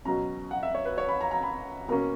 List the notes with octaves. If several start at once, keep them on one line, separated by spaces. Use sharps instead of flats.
B2 F#3 C#4 A#5
F#5
E5
C#5
B4
C#5
B5
A#5
A#5
B5
B2 A#3 C#4 A#5